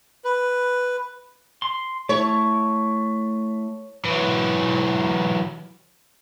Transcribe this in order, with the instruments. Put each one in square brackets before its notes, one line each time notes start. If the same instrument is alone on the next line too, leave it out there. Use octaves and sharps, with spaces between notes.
[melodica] B4
[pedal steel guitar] C6
[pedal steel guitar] A3 E4 [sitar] C#5
[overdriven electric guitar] E3 F#3